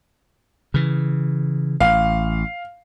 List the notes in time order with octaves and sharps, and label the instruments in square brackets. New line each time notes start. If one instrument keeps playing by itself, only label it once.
[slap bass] C#3 E3
[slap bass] A1 [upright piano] F5